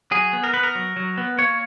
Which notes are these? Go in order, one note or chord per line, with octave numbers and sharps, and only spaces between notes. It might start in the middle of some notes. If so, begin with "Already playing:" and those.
F#3 G#4
B3
A#4
B3 B4
A#4
F#3
F#3
B3
A#3 C#5